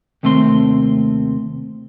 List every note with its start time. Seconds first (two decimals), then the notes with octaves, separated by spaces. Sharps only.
0.23 D#2 C3 A3 C4 C6